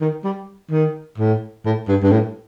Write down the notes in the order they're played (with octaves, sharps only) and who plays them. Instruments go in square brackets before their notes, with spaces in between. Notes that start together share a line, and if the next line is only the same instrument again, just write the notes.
[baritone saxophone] D#3
G3
D#3
A2
A2
G2
G2
A2